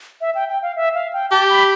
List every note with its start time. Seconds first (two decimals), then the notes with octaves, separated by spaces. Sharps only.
0.21 E5
0.35 G5
0.49 G5
0.63 F5
0.76 E5
0.95 F5
1.13 G5
1.31 G4 A5
1.50 B5